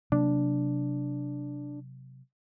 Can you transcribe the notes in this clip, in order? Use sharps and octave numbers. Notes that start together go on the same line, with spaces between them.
C3 F#3 A#3 D4